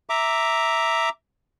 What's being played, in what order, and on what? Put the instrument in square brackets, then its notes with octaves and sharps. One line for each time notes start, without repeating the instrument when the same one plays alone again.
[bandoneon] E5 A#5 D6